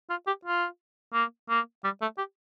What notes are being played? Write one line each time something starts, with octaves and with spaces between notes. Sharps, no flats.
F4
G4
F4
A#3
A#3
G3
A3
G4